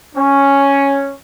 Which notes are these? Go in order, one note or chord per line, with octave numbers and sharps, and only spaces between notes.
C#4